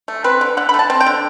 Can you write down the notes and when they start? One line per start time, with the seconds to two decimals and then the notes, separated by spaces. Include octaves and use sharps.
0.08 A3
0.24 C4 B4
0.41 D3
0.57 D3 F#5
0.69 B5
0.74 A3
0.79 A5
0.90 C4
1.00 G5
1.06 D3